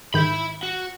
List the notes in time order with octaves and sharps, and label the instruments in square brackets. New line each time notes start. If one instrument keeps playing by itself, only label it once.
[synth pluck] G#2 D#3 G6 [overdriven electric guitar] E5 B5
[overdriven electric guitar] F#4